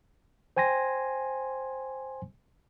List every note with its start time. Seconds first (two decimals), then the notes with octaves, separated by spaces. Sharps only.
0.57 C5 G5 G#5 C6 A#6